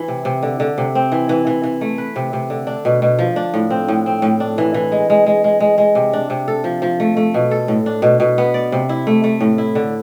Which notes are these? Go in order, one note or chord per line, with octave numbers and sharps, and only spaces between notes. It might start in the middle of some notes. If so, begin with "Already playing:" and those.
Already playing: E3 E4
C3
C3
D3
D3
C3
C4
E3
E3
E3
E3
A3
B4
C3
C3
D3
D4
B2
B2
F3
D4
A2
C4
A2
C4
A2
D4
E3
E3
G#3
G#3
G#3
G#3
G#3
G#3
C3
D4
C3
A4
F3
F3
A3
A3
B2
A4
A2
D4
B2
B2
B3
D5
C3
E4
A3
A3
A2
E4
D3